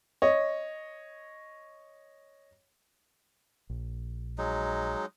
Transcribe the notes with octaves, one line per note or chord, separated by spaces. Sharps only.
C#5 D#5
A#1
F#3 G#3 D#4